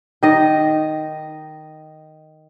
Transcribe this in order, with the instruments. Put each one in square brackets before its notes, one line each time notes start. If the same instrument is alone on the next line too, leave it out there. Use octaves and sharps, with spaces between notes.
[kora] D#3 D#5